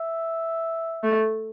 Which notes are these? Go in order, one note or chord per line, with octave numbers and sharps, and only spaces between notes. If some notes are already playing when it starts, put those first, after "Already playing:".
Already playing: E5
A3